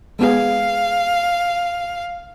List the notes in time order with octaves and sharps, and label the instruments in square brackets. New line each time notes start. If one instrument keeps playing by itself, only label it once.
[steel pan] G#3 B3 G#4 [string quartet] F5